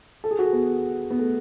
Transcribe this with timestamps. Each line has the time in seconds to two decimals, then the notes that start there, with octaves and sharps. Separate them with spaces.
0.24 A4
0.31 G#4
0.39 F#4
0.46 G#4
0.53 B3
1.11 B3
1.19 A3